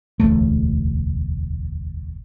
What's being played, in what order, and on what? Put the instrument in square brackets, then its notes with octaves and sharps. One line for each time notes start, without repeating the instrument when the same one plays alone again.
[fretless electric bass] E1 A1 D2 A3